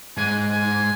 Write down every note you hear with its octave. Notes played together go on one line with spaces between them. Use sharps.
G#2 G#5
G#5